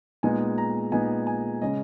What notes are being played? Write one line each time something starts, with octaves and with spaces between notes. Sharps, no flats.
A#2 G#3 B3 D#4 G#5
A#5
A#2 G#3 B3 D#4 G#5
G#5
C#3 G#3 C#4 D#5